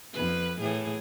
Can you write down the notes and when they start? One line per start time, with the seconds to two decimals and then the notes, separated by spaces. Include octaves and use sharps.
0.13 F2 B4
0.61 A2 E3 G#4